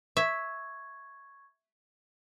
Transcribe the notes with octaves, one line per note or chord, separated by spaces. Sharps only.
E5 C#6 G#6